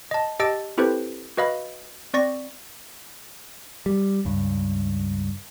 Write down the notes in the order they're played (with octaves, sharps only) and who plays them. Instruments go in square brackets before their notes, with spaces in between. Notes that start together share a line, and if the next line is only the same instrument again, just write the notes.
[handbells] D#5 A5
G4 D#5 A5 E6 A6 D7
C4 E4 G4 A4 B4 C5
F#4 B4 D#5 F5 B5
C4 D5 C#6 A#6
[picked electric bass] G3
C#2 G2